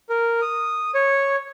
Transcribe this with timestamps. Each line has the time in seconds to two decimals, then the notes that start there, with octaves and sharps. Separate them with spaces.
0.09 A#4
0.42 D#6
0.95 C#5